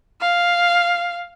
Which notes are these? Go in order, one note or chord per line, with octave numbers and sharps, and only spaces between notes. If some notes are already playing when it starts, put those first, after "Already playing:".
F5